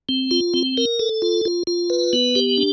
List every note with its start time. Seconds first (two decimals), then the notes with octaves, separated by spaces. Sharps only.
0.09 C4
0.31 F4
0.54 C4
0.77 A#4
0.99 A4
1.22 F4
1.45 F4
1.67 F4
1.90 B4
2.13 B3
2.35 G4
2.58 D4